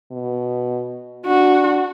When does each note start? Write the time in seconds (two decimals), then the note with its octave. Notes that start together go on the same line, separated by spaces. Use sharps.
0.12 B2
1.26 D4 F#4